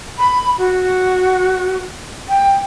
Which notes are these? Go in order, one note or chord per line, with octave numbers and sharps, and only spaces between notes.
B5
F#4
G5